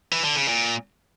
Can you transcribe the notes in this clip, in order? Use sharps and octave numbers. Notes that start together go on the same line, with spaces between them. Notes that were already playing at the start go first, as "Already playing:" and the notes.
E3
D3
C#3
A#2